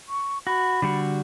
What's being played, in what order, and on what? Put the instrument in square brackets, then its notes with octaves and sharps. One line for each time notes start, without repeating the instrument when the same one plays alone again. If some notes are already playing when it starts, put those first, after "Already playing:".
[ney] C#6
[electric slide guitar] F#4 [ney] B5
[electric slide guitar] D3 G3 F#4